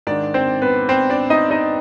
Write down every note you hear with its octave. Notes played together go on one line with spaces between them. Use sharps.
G#2 D#3 D4 D5
C4 C5
B3 B4
C4 C5
D4 D5
D#4 D#5
D#4 D#5